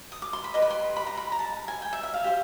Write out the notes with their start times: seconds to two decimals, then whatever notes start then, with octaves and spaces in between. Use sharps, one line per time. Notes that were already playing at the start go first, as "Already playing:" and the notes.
0.12 D#6
0.22 D6
0.33 C6
0.44 B5
0.54 G4 B4 D#5 C6
0.62 B5
0.70 C6
0.96 B5
1.07 A#5
1.17 B5
1.32 A#5
1.39 A5
1.68 G#5
1.82 G5
1.93 E5
2.03 E5
2.14 F5
2.24 G4 C5